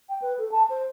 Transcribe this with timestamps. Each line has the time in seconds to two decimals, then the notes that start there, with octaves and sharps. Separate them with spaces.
0.09 G5
0.22 B4
0.38 A4
0.52 A5
0.70 C5